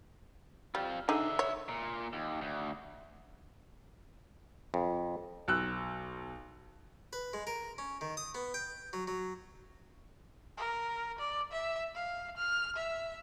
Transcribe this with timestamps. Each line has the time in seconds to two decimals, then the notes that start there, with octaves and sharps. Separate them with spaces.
0.75 G3 C4 F4
1.09 D3 D4 D#4 G#4 E5
1.39 C#5
1.69 A#2
2.13 D#2
2.41 D2
4.74 F2
5.48 B1 E6 F#6
7.13 B4
7.33 G#3
7.47 A#4
7.78 C#4
8.01 D#3
8.17 D#6
8.35 B3
8.54 G5
8.93 F#3
9.08 F#3
10.57 A#4
11.19 D5
11.52 E5
11.95 F5
12.37 F6
12.76 E5